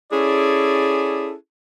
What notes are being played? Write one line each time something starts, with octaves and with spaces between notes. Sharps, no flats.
C#4 E4 G#4 A4 D5